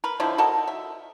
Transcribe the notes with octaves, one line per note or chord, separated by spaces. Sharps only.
A#4 B4
D3 F3 D#4 E4
F#4 A4 A#4 D#5
E5